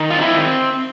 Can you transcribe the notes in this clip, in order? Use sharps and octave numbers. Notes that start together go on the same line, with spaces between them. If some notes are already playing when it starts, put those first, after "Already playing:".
Already playing: D#3
C4 F4
E4